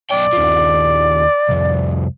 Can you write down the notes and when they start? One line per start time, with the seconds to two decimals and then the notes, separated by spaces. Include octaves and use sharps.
0.11 B1 D5 G5
0.33 D#2 F3
1.49 C2 F2